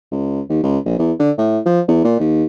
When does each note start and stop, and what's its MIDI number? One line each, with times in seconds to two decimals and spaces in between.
0.11 0.41 37
0.49 0.59 39
0.63 0.79 37
0.85 0.95 34
0.99 1.12 40
1.19 1.31 50
1.38 1.59 45
1.66 1.81 53
1.88 2.02 40
2.04 2.16 46
2.20 2.44 39